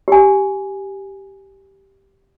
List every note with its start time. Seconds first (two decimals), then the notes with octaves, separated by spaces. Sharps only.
0.08 G4 G#5